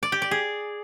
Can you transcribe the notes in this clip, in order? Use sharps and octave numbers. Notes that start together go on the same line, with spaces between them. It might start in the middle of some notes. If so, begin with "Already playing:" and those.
D5
G4
D5
G#4